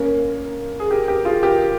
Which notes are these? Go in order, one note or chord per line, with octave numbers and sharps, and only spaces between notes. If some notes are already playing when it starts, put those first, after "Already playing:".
Already playing: A#3 C#4
G#4
G4 A#4
G4 A#4
F4 G#4
G4 A#4